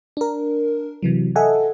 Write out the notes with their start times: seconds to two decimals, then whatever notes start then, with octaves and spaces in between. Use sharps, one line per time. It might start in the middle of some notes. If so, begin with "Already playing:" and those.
0.17 D4 A#4
1.03 C3 E3 F#3
1.36 A4 D#5 E5 F#5 G#5